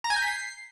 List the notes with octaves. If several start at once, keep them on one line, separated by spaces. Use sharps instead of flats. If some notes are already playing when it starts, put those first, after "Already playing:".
A#5
G#5
G6
B6
C7